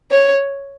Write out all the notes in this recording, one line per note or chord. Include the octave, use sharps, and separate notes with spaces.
C#5